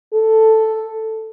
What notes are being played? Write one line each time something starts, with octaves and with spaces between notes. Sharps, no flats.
A4